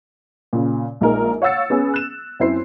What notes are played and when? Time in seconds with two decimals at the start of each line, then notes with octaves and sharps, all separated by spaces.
0.53 A#2 C#3
1.01 A#1 G#3 A#3 D#4 A#4
1.42 C#5 F5 F#5 E6 A6 C#7
1.70 B3 C#4 G#4
1.94 F#6 E7
2.40 F#2 C4 E4 C5 C7